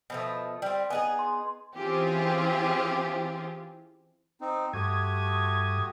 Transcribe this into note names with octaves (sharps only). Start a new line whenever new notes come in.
B2 F3 A3
G3 C4
B3 D#4 G#4 G#5
C6
E3 C4 C#4 F4 G4 G#4
C4 D#4
G2 A3 F#4 G4 D#6 G#6